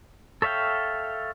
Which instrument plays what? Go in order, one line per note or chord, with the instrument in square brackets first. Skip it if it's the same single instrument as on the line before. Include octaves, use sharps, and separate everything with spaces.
[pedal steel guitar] A4 C#5 E5 F5 G5